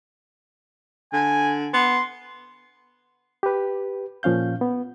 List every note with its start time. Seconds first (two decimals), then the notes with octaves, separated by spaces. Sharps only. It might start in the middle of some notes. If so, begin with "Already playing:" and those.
1.13 D3 G#5
1.74 B3 C6
3.43 G4 B4
4.23 A#2 F3 C#4 F5 G6
4.61 B3